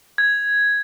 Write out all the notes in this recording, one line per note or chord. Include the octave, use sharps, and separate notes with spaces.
G#6